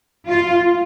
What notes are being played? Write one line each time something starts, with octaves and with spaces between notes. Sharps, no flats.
F4